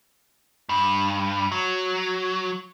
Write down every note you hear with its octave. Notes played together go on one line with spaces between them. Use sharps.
G2
F#3